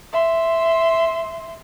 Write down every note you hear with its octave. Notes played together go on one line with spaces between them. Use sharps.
E5 C6